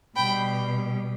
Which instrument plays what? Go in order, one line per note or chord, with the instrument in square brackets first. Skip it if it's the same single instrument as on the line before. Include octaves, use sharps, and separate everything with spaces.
[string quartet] B2 G3 G5 B5